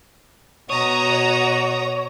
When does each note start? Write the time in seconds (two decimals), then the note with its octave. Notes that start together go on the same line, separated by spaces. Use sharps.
0.70 B2 F#4 C#5 D#5 A#5 D#6